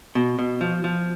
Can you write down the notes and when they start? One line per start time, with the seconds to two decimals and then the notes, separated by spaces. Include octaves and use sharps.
0.15 B2
0.39 B2
0.61 F3
0.84 F3